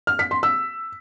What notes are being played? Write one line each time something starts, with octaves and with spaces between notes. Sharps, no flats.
F6
B6
C6
E6